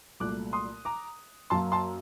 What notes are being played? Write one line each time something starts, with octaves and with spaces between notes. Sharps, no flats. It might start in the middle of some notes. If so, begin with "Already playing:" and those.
C2 A#2 F#3 A3 D6 F#6
C6 D#6
A#5 D6
F#2 F#3 A#3 A5 C6
A5 C6